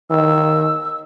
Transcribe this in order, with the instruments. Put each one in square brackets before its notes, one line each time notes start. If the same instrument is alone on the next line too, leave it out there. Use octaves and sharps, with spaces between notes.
[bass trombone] D#3 [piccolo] E6